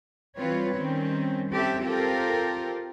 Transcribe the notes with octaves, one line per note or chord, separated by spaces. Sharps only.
E3 G3 C4 F4 B4 C#5
D#3 G3 C4 C#4
C4 C#4 G4 A4 E5
C4 F4 G4 A4 A#4